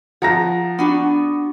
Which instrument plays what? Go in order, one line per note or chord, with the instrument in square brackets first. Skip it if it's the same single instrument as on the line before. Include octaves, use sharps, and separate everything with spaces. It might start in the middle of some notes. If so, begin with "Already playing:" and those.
[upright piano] F3 A#5 A#6 [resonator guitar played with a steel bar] F#5
[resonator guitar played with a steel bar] B3 D4 F#4